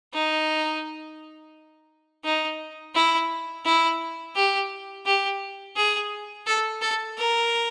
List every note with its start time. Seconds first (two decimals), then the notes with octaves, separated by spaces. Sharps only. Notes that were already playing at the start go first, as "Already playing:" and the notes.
0.14 D#4
2.25 D#4
2.95 E4
3.65 E4
4.36 G4
5.06 G4
5.77 G#4
6.47 A4
6.82 A4
7.17 A#4